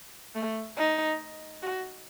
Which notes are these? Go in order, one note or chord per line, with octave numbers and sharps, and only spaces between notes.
A3
D#4
F#4